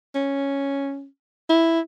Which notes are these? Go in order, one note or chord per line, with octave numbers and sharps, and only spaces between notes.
C#4
E4